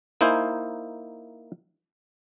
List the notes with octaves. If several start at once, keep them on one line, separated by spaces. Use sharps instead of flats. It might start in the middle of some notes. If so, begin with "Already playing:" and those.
A#3 D#4 E4 C5 G#5